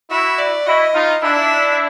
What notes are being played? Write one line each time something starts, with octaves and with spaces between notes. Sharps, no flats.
E4 F#4 E5
D5
E4 F#4 D#5
D#4 F4
D4 E4 E5